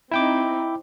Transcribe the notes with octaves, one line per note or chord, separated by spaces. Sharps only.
C4 D#4 E4 G5 D6